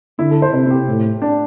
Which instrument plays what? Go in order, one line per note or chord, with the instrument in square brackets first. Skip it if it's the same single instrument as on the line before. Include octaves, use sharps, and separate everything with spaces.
[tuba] D3 [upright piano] E4
[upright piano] A4
C5
[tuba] C3 [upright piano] C5
[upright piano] E4
G4
[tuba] A2
[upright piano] D4